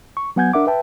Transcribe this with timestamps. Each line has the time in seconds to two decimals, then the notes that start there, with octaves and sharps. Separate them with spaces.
0.17 C#6
0.36 F#3 B3 F#5 G#5 G6 G#6
0.53 D4 A#4 E5 F#5 D6
0.67 B4 E5 G5 A5